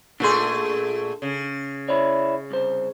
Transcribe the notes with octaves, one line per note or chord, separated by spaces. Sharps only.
A#2 A3 D4 G#4 A4 C6
C#3
E4 C#5 D5
C2 C5